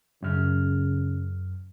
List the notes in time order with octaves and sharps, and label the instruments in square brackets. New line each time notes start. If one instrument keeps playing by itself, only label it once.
[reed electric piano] F#2 F6 [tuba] C#3